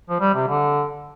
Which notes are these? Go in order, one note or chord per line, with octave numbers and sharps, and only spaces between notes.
F3
G3
C3
D3